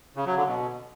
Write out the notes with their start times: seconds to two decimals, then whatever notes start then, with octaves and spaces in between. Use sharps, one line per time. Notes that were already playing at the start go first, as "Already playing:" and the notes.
0.16 C#3
0.27 F#3
0.37 D3
0.47 B2